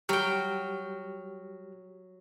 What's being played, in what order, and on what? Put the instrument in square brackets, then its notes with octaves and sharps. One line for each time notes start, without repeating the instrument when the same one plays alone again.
[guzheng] F#3 G5 [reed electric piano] G3 G4 F6